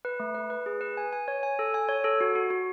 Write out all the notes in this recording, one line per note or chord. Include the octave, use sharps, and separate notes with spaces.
B4
A3
B4
B4
G#4
B4
G#5
G#5
C#5
G#5
A4
G#5
C#5
A4
F#4
F#4
F#4